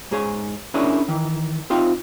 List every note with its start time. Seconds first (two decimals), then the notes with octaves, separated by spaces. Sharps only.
0.11 G#2 G#4 C#5
0.74 C#4 D4 E4 G#4 A#4 C#5
1.08 D#3 E3
1.70 C4 D#4 F4 C5 F5 G5